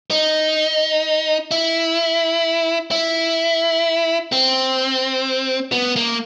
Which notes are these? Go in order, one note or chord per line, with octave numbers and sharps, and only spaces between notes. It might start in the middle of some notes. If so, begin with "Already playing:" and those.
D#4
E4
E4
C4
B3
A#3